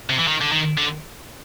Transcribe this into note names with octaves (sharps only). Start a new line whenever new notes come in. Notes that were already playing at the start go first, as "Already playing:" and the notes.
C3
E3
D#3
D3
D#3
D3